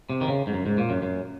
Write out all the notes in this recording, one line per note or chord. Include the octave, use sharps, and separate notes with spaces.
C3
D#3
C#3
G#2
F#2
G#2
A#2
F#2
F#2